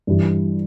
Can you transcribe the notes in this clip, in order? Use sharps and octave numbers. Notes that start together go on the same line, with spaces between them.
G2 E3 G3